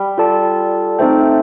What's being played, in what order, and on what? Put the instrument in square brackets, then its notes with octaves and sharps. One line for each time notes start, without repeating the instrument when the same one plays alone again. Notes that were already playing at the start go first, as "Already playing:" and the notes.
Already playing: [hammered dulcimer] G3
[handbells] F4 A4 D5 A5
[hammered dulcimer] A3 [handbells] C4 D#4 A4 C5 G5